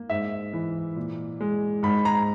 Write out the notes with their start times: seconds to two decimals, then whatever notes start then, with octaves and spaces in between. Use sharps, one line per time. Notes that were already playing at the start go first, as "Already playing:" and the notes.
Already playing: A#3
0.09 G#2 E5
0.53 E3
0.96 A#2
1.41 G#3
1.83 G#2 B5
2.05 A#5